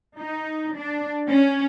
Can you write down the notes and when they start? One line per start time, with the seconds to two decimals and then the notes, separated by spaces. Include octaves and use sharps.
0.20 D#4
0.77 D4
1.30 C#4